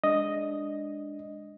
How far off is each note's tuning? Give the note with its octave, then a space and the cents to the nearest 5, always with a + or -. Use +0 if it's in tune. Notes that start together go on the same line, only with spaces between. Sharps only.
G#3 -15 D4 +0 D#5 +0